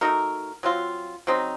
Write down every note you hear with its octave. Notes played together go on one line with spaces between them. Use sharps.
A3 D#4 F#4 A#4
F#3 C4 F4
C#3 F#3 C4 D#4